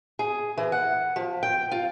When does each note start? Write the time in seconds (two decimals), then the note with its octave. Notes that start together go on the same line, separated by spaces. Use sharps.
0.19 G#4
0.57 E3
0.72 F#5
1.16 F3
1.43 G5
1.71 F4